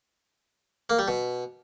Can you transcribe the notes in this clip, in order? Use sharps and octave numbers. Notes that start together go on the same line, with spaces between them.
A#3
G3
B2